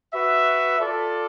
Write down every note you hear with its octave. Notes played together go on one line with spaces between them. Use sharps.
F#4 B4 E5
F4 A4 D5